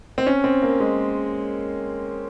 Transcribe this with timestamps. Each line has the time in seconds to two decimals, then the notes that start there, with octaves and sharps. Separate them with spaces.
0.18 C4
0.27 C#4
0.44 C4
0.62 A#3
0.80 G#3